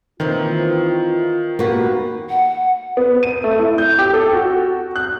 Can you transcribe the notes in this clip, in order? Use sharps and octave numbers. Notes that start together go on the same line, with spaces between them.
D#3 E3 A#3 C4 F4
A#3 B3 F#4 G4 B4
F#5
B3
D#7
A3
E4
G6
G4
A4
F#4
F#6